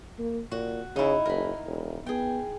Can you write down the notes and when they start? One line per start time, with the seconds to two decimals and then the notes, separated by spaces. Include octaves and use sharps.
0.19 A#3
0.51 A#2 F#4
0.96 C#3 D#4 E4
1.25 F#1 A#4 B5
1.66 E1
2.06 B3 G#4 G5